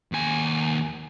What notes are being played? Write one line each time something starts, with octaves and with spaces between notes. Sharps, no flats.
D#2 G#5